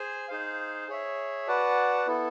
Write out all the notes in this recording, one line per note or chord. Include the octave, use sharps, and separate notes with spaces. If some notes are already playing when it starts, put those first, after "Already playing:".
Already playing: G#4 C5 G#5
D#4 G#4 C5 F5
G#4 C#5 E5
F#4 B4 D5 F#5 A5
B3 E4 A4